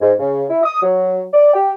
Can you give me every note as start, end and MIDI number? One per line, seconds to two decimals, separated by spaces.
0.01 0.13 44
0.19 0.45 49
0.50 0.61 64
0.63 0.80 87
0.82 1.24 54
1.33 1.53 74
1.54 1.72 67